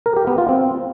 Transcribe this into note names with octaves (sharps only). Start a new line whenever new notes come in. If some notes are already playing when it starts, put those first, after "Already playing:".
A#4
G4
B3
F4
C4